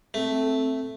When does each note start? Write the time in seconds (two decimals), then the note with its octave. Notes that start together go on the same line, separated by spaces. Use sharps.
0.14 A3 C4